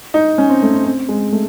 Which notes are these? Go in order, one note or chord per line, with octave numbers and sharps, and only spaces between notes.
D#4
C#4
C4
A3
C4
C4
G#3
A3